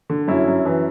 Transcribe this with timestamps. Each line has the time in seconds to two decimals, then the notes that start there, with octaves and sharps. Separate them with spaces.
0.10 D3
0.28 F#2 C#4 E4
0.48 F#2
0.66 E3